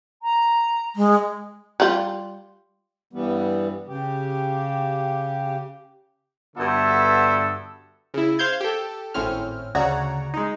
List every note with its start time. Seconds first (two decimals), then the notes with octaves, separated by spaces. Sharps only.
0.23 A#5
0.96 G#3
1.80 G3 F4
3.13 G2 E3 G3 B3
3.87 C#3 G4
6.57 G2 D3 B3 F#4 A4 E5
8.14 C#3 E4
8.39 C5 F5 G6 G#6
8.61 G4 A4
9.14 G#1 A2 C4 C#4 F6
9.75 D2 C#3 F#4 C#5 D5 A#5
10.34 G#3 D#4